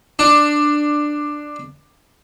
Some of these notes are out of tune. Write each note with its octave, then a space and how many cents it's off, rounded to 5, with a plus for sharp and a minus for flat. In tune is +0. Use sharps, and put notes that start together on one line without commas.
D4 +10